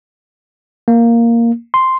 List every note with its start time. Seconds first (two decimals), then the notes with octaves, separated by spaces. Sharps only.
0.88 A#3
1.74 C6